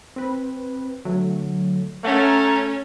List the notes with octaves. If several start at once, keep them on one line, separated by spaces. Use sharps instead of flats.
C4 B4
D3 F#3 A3
A3 C#4 C#5 F#5 A#5